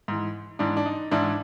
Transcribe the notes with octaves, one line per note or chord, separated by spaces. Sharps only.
G#2 E3
G#2 E3 D4
D4
D#4
G#2 E3 D4 E4